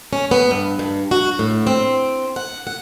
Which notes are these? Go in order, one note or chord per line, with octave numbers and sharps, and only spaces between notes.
C#4
B3
G2
G2
F#4
A2
C4
F#5
F#5